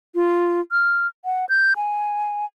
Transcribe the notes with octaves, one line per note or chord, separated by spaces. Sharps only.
F4
F6
F#5
G6
G#5